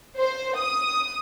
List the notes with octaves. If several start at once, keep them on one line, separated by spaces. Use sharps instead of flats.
C5
D#6